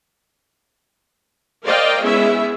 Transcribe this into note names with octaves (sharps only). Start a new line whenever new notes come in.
A#4 C5 D5 D#5 F5 G5
G#3 B3 C#4 E4 G#4 E5